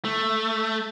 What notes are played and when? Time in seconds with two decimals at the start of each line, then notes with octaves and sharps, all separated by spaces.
0.05 A3